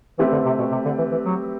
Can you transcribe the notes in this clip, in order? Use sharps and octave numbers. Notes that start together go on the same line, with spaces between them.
E3 A3 C4 G4 B4
D3
C3
B2
C3
D3
E3
E3
F#3